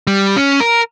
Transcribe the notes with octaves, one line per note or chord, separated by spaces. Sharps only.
G3
C#4
A#4